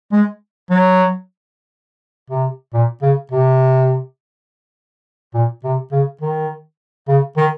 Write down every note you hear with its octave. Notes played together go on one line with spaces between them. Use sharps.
G#3
F#3
C3
A#2
C#3
C3
A#2
C3
C#3
D#3
C#3
D#3